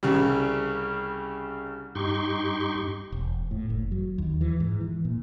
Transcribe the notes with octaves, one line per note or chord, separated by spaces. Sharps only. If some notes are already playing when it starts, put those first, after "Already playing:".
C2 C#3 G3
G2 D#4 G4 C6 C#6
E1
A2
F#1
F#3
D#2
E3
G#2
E3
A#2